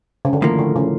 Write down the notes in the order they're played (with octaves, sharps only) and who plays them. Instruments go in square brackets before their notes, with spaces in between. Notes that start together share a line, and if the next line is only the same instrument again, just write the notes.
[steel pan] C#3
D3
[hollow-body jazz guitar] A2 F3 A#3 [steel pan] D#3
[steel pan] D3
C#3